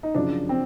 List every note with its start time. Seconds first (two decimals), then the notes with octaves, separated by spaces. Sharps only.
0.03 D#4
0.15 F#2 C#3 F3 D4
0.49 C4